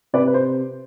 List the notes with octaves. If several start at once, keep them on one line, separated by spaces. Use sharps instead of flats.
C3 B4 D5
B4
C5